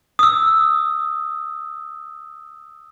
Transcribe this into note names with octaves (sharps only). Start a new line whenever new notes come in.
D#6 E6